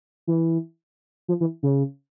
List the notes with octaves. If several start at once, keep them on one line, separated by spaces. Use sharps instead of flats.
E3
F3
E3
C#3